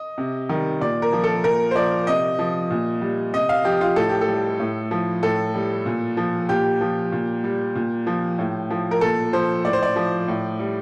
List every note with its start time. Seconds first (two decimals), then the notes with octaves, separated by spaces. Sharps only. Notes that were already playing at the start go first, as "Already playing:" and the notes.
Already playing: D#5
0.18 C3
0.49 D#3 G3
0.81 A#2 D5
1.02 A#4
1.13 F3
1.24 A4
1.44 A#2 A#4
1.71 C5
1.76 F3 D5
2.07 C3 D#5
2.39 F3
2.70 A#2
3.01 G3
3.33 C3 D#5
3.49 F5
3.65 F3 G4
3.81 F4
3.96 A2 A4
4.09 G4
4.21 A4
4.28 G3
4.60 A2
4.91 F3
5.23 A2 A4
5.54 G3
5.86 A#2
6.17 F3
6.49 A#2 G4
6.81 F3
7.12 A#2
7.44 G3
7.75 A#2
8.07 F3
8.39 A2
8.70 F3
8.91 A#4
9.01 A#2 A4
9.33 F3 C5
9.65 A2 D5
9.73 C5
9.83 D5
9.96 F3
10.28 A2
10.59 G3